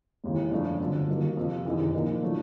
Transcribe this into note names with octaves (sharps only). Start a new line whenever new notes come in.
E1 D#2 C#3 E3
F#2 C#3 F3 A3 D4
G1 F2 D3 F#3
G2 D#3 F#3 A#3
F2 C3 F3
F#1 E2 C3 D#3
A#2 F3 A#3 D#4
A2 F#3 A3 D4